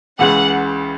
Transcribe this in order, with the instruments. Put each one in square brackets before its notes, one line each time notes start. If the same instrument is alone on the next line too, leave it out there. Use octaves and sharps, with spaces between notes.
[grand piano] C#2 C#3 E3 [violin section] F#5